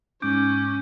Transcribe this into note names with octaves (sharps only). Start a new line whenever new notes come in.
G#2 C#4 D6 G6